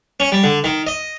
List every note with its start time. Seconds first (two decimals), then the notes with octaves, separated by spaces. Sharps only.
0.20 C#4
0.32 G3
0.44 D3
0.64 D#3
0.87 D#5